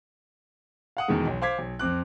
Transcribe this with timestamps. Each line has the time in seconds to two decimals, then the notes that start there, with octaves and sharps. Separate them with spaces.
0.97 F5 F#5 D#6
1.08 E2 B2 D#3 E3 G#3
1.27 B1
1.42 C5 F5 D6 G#6 B6
1.58 B1
1.79 F2 C4 D6 F#6